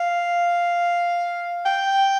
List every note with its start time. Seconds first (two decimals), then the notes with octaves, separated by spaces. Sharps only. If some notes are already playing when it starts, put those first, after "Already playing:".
Already playing: F5
1.66 G5